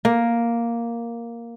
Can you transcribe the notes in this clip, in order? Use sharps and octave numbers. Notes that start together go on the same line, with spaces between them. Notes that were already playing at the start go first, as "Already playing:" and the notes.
A#3